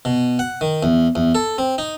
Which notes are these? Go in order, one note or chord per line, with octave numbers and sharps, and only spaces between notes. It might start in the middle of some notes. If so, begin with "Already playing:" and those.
B2
F#5
D#3
E2
E2
A4
C4
D#4